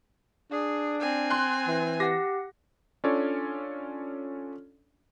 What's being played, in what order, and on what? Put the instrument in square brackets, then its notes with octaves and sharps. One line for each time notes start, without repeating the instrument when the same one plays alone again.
[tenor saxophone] D4 [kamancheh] G#4
[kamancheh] C4 G#5
[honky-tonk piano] C6 F#6
[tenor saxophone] E3
[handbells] G4 F#5 [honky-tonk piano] A#6
[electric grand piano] C#4 D4 F4 A4 C#5 D5